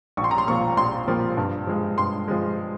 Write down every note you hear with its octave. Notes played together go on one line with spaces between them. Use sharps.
A#1 C#6
C6
A#5
C6
A#2 F3 A#3 C#6
A#1 C6
A#2 F3 A#3
G2
F3 G#3
G2 C6
F3 G#3